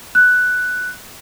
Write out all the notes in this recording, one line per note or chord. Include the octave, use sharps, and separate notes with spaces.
F#6